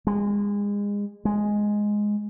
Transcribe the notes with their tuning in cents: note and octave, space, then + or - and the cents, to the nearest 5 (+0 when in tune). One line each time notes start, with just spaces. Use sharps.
G#3 -30
G#3 +0